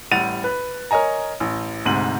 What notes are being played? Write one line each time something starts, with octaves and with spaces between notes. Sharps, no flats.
A1 G3 F#5 A6 D#7 F7
B4
A#4 C#5 D#5 G#5 A#5
A1
D2 G#2 C3 D#7 F#7